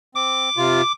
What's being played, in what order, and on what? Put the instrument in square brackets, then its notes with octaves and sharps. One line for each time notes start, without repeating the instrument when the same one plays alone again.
[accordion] C4 [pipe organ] D6
[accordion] C3 F4